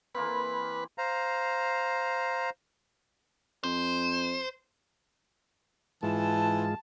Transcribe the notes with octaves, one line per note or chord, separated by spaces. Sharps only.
E3 A#3 C4 B4
C5 F5 A#5
F2 C5
G#2 E3 G#3 F4 A5